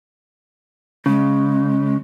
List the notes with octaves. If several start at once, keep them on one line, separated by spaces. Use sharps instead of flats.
C#3 G#3